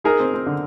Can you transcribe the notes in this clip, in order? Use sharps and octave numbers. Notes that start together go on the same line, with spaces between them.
D#4 G#4 A#4
C4
C4
D3